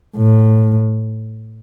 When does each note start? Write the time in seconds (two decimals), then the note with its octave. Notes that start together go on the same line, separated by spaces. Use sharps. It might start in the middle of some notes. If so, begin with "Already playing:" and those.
0.17 A2